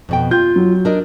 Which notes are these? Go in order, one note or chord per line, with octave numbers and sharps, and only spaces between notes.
F2 B2 G5
F4 G6
F#3
D4 A#4 D#5